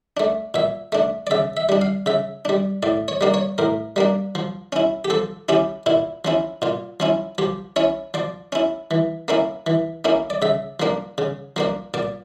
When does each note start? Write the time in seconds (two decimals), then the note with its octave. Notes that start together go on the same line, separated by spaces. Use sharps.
0.17 A3 D4
0.54 A#2 E5
0.92 A3 D4
1.27 D5
1.31 C#3 E5
1.57 E5
1.69 G3 D4
1.82 F5
2.06 C#3 E5
2.45 G3 D4
2.83 A2 D5
3.08 C#5
3.21 G3 A#3 D4
3.34 C#5
3.58 A2 A#4
3.96 G3 A#3 D4
4.35 F3
4.72 C#4 E4
5.05 G4
5.10 F3 A4
5.49 C#4 E4 G4
5.86 A#2 E4
6.25 F3 C#4 E4
6.62 A#2 F4
7.00 F3 C#4 E4
7.38 F3 G4
7.76 C#4 E4 C#5
8.14 F3 D5
8.52 C#4 E4
8.91 E3
9.28 A#3 C#4 E4
9.66 E3
10.05 A#3 C#4 E4
10.30 D5
10.42 C#3 E5
10.80 F3 A#3 D4
11.18 C#3
11.56 F3 A#3 D4
11.94 A#2 D5